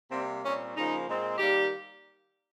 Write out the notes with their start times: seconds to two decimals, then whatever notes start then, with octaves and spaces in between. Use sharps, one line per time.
0.11 C3 G3 A#3 C4
0.43 A#2 G3 C4 C#4
0.75 C#3 F3 A#3 D#4
1.06 A#2 G#3 C4
1.37 D#3 G3 A#3 G4